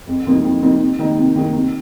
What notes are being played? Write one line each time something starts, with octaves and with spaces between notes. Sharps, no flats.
F2
C3 F3 A#3 D#4
F2
C3 F3 A#3 D#4
C3
D#3 A#3 D#4
C3
D#3 A#3 D#4
C3